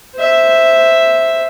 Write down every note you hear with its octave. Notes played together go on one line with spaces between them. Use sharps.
C5 E5